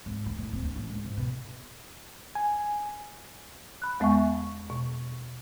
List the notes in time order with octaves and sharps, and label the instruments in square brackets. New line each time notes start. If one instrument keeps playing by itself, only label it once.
[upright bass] G#1
D#3
A2
D1
D4
A1
C#2
G#2
B2
[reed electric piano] G#5
[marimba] B5 F#6
E2 G#3 B3 E5 G#5 C#6
B2